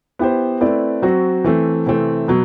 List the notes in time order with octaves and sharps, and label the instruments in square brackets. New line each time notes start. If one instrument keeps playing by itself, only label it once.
[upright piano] B3 E4 G4 C5
A3 C4 E4 B4 D5
F#3 C4 F#4 C5
E3 A3 C4
C3 E3 A3 C4
B2 F#3